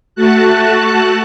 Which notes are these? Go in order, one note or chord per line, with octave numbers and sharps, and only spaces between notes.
A3 F#4 A5 F#6